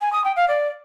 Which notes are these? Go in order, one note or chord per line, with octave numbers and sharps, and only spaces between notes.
G#5
D#6
G5
F5
D5